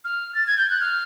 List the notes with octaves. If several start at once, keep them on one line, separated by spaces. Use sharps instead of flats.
F6
A6
G#6
G6
F#6
F6